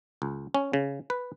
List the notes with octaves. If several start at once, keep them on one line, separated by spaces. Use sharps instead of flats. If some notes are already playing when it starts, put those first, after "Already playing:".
C#2
C#4
C#3
B4